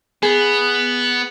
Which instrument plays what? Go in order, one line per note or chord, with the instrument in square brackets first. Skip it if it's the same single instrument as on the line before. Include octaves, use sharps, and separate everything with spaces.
[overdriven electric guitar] B3 [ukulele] G#4